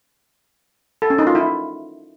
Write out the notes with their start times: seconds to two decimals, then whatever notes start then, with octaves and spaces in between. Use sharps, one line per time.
1.02 A4
1.10 C#4
1.18 D#4
1.27 F4
1.35 E4